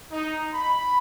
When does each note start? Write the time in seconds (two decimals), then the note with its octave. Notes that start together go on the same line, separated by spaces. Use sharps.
0.12 D#4
0.53 B5